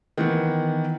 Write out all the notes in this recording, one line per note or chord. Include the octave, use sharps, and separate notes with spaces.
D#3 E3 B3